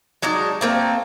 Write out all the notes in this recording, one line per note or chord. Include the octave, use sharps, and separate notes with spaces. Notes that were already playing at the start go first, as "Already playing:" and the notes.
F#3 G#3 D4 D#4
A3 A#3 C4